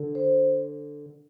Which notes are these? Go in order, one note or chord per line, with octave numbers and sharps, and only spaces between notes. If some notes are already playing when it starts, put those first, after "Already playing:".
Already playing: D3
C5